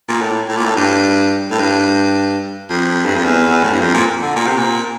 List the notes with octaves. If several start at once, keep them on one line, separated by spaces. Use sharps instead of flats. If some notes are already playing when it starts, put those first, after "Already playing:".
A#2
A2
A2
A#2
A2
G2
A2
G2
F2
G2
F2
E2
A2
G2
F2
A#2
D3
A#2
C3
A#2